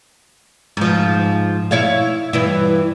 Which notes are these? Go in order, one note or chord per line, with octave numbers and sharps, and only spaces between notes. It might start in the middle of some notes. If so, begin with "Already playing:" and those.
G#2 F3
E4 C#5 F5
G2 E3 E4